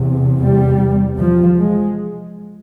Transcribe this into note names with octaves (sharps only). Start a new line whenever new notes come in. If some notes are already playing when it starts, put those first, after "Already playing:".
Already playing: E2 C3
G3
F3
G#3